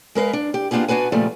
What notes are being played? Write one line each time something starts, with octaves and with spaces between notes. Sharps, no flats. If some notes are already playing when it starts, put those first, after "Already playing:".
G#3 A#4 B4 F5
D4
G4
A#3 B3 D4 F4 G4 G#4
B3 D4 F#4 B4 G#5
A#2 C#3 F3 G3 A3